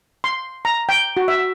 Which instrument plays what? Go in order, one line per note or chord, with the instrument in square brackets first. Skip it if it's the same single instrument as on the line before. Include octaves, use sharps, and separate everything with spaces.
[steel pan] C6
A#5
G5
F#4
E5